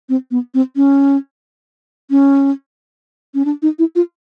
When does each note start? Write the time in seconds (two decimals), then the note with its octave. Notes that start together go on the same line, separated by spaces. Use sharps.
0.09 C4
0.31 B3
0.54 C4
0.76 C#4
2.10 C#4
3.34 C#4
3.45 D4
3.62 D#4
3.79 E4
3.95 F4